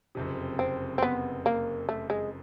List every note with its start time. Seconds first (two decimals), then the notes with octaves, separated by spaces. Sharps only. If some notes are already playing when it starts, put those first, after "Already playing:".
0.15 F#1 F2 C3
0.59 C4
0.98 C4
1.02 B3
1.46 A#3
1.89 A3
2.10 G#3